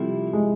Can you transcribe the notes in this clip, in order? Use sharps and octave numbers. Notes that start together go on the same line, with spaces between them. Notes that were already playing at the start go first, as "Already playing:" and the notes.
Already playing: C3 F3 G3 A3 C4 E4
G#3